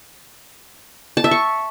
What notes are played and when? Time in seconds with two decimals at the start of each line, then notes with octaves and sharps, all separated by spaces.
1.17 A5
1.24 E5
1.31 C#6